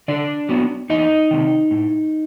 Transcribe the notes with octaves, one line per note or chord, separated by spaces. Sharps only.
D3 D4 D5
F#3 B3
E2 D#4 D#5
C3 D#3
A2